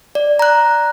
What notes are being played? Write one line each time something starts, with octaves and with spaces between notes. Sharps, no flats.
D5
A#5 F#6